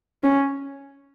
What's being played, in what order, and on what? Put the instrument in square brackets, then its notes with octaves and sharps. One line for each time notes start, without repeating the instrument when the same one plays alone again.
[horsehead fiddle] C#4